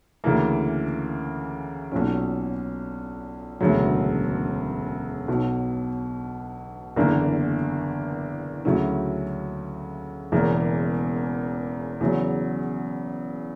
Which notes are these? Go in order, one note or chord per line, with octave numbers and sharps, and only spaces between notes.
D2 C#3 E3 A#3
B1 A#2 F#3 C#4
E1 D2 C#3 F#3
B1 B2 F#3
F#1 E2 D3 A#3
D2 C#3 F#3 C#4 E4
E1 E2 C#3 E3 A#3
E2 C#3 F#3